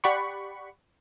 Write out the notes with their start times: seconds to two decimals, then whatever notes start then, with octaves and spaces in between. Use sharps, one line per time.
0.04 G4 D5 F#5 B5 C#6